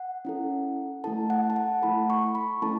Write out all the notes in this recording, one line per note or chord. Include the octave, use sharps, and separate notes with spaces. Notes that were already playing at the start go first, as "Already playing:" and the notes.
Already playing: F#5
C#4 E4 A4
A3 E4 A4 A5
F#5
A5
F#5
A3 E4 A4 B5
C#6
B5
A3 C#4 E4 A4 A5